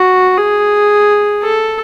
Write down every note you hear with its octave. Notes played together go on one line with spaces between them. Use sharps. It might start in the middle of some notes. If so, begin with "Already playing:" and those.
Already playing: F#4
G#4
A4